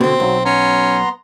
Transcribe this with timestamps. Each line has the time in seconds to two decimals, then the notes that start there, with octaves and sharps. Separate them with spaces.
0.01 B2 D3 C4
0.20 B1 F#3
0.45 B3 C#4 A#5 C6